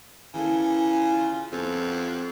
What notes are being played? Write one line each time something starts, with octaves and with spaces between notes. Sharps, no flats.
C#3 E3 A#3 A4
F4
F2 B3 G4 A4